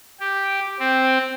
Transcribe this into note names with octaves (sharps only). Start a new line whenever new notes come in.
G4
C4